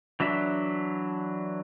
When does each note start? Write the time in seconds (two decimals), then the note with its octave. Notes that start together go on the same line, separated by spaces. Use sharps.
0.20 E3 F#3 D4 E5